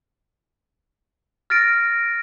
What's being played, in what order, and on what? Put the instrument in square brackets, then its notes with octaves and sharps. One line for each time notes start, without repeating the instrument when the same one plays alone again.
[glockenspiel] F6 A6 A#6 D7